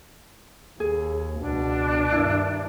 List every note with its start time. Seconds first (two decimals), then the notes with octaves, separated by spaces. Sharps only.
0.80 D#2 G#4
1.41 C#2 B2 D4
2.12 G2 D#3 E4